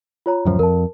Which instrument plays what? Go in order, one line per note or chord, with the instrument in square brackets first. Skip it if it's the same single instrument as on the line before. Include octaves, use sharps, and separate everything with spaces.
[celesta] F4 C#5 A#5
[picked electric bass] D1 F#2 F3
[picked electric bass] F2 [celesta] A#4 A5